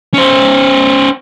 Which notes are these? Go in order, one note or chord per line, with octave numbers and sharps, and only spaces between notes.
C#4 C5